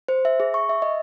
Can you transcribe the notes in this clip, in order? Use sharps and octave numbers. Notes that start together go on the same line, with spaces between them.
C5
E5
G#4
C#6
E5
D#5